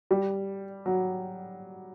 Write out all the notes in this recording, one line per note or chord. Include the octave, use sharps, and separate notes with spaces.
G3
F#3